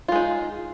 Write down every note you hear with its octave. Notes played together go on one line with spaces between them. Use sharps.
G#3 D#4 F4